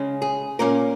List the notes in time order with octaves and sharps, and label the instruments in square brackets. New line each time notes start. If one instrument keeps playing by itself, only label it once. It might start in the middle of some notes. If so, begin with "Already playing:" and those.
Already playing: [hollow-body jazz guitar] C#3 G#3 C#4
G#4
A#2 A#3 C#4 A#4